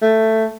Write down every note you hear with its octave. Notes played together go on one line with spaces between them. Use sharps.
A3